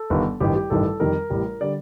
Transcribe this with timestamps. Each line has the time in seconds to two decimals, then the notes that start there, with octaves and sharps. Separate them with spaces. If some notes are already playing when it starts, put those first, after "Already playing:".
Already playing: A4
0.10 G1 G2 D#3
0.40 A1 G2 D#3 G3 G4
0.56 G4
0.70 A1 G2 D#3 G3 A4
1.00 F2 D#3 G3 A#4
1.30 A1 A2 G3
1.61 D3 G3 D5